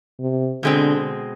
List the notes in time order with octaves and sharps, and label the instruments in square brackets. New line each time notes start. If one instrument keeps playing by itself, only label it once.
[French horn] C3
[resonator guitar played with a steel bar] B2 G#3 C4 [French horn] D3